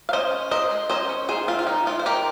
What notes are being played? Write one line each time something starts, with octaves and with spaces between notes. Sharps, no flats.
F5
C#4 C5 D#5
C#4
G#3 C5 D#5
G#3
C#4 C5 D#5
C#4
D#3 G#4 C5
C4 F4
F4
D#3 D#4
G#3 F4
C5
D#3 G4 A#4